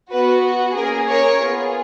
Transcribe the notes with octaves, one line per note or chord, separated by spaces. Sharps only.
B3 F#4 B4
A#3 C#4 G#4 A#4
A#4 C#5
B3 F4 G#4